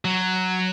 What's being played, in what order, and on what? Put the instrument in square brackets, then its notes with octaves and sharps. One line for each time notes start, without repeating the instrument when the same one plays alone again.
[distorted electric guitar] F#3